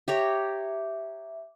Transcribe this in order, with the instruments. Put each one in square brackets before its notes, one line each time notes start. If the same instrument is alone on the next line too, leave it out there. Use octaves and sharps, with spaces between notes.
[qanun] G4 C#5 A#5 [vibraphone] E5